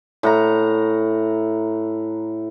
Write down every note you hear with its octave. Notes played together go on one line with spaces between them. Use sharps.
A2 F#5 A#5